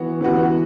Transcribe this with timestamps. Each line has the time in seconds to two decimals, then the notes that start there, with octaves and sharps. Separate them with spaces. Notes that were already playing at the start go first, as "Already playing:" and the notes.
Already playing: E3 B3 F#4
0.21 E3 B3 F#4 B4